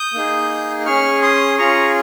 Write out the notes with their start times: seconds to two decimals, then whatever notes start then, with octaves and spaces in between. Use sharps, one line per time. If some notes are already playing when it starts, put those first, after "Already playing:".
Already playing: D#6 G6
0.14 A#3 D#4 G#4
0.86 C#4 G#4 C#6 F6
1.22 C6 D#6
1.58 C#4 F4 G#4 A#5 C#6